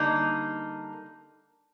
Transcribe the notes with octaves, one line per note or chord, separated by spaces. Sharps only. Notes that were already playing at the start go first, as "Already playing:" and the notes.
Already playing: D3 G3 A#3 D#4